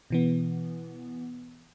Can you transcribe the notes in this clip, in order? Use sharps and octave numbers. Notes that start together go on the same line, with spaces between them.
B2 E3 B3